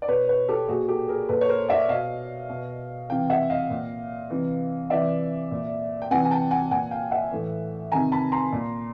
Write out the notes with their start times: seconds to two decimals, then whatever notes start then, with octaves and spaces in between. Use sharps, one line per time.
0.02 D5
0.08 B2 B4 C#5
0.29 B4 C#5
0.49 G4 A4
0.68 A#2 F#4 G#4
0.88 G4 A4
1.08 G#4 A#4
1.29 A#2 A4 B4
1.41 C#5
1.49 A#4 C5
1.69 D5 E5
1.89 B2 D#5 F5
2.49 B2
3.10 C3 E3 F5 G5
3.30 E5 F#5
3.50 D#5 F5
3.70 A#2
4.30 C3 E3
4.90 C3 E3 D5 E5
5.51 A#2
6.02 G5
6.11 C3 E3 F#5 G#5
6.25 G#5
6.31 G5 A5
6.51 F#5 G#5
6.71 A#2 F#5 G#5
6.91 F5 G5
7.11 E5 F#5
7.31 A2 E3
7.92 C3 D#3 G#5 A#5
8.12 A5 B5
8.32 A#5 C6
8.52 A#2